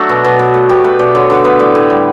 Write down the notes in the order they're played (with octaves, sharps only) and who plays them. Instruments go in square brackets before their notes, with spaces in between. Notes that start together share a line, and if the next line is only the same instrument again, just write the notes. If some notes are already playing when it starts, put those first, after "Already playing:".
Already playing: [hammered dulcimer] F#3 A3 D4 F#4
B2
B2
B2
A3
B2 G4
A3 B4
B2 D5
D3 C#5
D3 B4
B3 B4
A2 D5
A2
G3